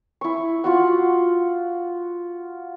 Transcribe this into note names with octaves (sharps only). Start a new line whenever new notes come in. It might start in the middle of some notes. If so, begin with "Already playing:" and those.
E4 C#6
F4 F#4 F#5